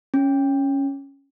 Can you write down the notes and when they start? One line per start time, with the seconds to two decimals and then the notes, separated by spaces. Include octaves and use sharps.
0.14 C#4